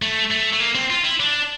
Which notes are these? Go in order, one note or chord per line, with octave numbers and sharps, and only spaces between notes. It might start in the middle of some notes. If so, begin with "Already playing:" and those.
A3
A3
A3
A#3
C4
F4
E4
D4